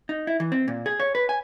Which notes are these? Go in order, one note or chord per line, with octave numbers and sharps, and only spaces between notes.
D#4
E4
E3
C4
A#2
G#4
C#5
B4
G#5